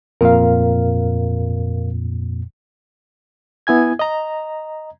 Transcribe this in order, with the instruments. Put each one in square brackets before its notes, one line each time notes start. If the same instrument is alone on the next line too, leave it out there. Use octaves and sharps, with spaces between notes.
[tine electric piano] F2 A#2 [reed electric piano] A#4 F5
[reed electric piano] B3 E4 G#5 G#6
D#5 A#5